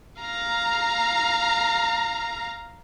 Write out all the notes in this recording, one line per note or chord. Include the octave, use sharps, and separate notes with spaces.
F5 A#5